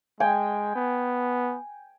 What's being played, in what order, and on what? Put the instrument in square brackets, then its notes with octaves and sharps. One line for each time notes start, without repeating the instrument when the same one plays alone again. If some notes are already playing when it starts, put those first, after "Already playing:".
[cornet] G#3 [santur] G5 G#5
[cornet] B3